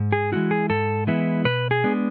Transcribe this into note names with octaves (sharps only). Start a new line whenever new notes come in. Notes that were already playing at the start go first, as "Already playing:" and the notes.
Already playing: G#2
G#4
E3 G#3 B3 E4 F#4
G#4
G#2 A4
E3 G#3 B3 E4
B2 B4
G#4
G#3 B3 D4